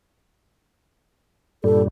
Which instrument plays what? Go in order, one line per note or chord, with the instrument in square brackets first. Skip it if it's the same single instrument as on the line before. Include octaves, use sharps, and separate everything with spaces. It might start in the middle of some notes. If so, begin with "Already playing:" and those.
[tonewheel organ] G2 A#2 G3 [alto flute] A4